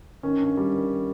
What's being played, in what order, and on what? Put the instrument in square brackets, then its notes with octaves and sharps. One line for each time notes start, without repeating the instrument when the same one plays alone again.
[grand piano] D#3 [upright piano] C#4
[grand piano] G2
G3
D#3